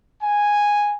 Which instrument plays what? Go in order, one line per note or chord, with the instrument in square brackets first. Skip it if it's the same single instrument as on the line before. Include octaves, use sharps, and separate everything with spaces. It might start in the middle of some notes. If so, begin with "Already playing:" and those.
[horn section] G#5